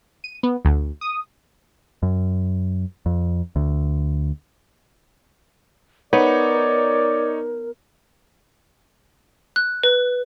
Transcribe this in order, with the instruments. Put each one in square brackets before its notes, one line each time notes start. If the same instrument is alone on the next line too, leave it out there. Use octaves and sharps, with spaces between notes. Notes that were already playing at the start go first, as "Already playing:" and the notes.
[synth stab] D#7
B3
D2
D#6
[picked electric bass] F#2
F2
D2
[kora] B3 [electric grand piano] D#4 C#5 [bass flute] A#4 [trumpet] D5
[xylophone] F#6
B4